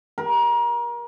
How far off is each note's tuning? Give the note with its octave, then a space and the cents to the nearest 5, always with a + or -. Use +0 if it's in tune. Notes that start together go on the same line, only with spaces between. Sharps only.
A#4 +30